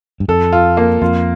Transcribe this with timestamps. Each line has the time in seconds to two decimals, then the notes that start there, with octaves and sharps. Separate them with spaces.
0.20 G2
0.28 F2 A4
0.53 F4
0.77 A#3
1.02 F2 F4